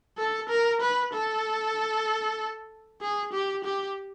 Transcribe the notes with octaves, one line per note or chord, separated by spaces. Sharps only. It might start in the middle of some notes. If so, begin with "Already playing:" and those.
A4
A#4
B4
A4
G#4
G4
G4